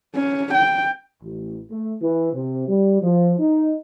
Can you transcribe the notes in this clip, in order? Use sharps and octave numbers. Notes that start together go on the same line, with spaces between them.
C#4
G5
A1
A3
E3
C3
G3
F3
D#4